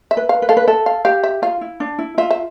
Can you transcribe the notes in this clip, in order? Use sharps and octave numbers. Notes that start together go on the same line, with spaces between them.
E5
B4
F5
B4
A4 F5
B4
A4 E5
F5
G4 F5
E5
F4 F5
E4
D4
E4
F4 E5
E5